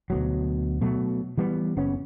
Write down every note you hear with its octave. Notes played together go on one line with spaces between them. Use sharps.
D2 B2 F#3
B2 F#3 A3
E3 G3 B3
F#1 C#3 B3 C#4